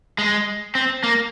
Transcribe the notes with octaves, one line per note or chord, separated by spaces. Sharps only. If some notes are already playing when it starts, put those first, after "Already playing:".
G#3
C4
A#3